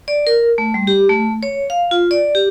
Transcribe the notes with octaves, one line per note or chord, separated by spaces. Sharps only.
D5
A#4
A3
G3
G4
A3
C#5
F5
F4
D5
G4